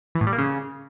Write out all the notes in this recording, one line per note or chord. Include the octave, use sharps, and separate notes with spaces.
E3
A2
G3
A#3
C#3